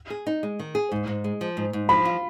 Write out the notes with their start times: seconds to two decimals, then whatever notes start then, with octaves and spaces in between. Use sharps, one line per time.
0.10 G#4
0.27 D#4
0.43 G#3
0.60 D#3
0.75 G#4
0.92 G#2
1.07 G#2
1.24 G#3
1.41 F3
1.57 G#2
1.73 G#2
1.89 F3 B5
2.05 F4